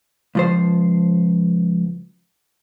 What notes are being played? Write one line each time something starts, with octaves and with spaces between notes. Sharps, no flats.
C#2 F3 C5